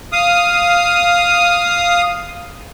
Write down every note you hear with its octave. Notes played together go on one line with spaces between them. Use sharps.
F5 D#6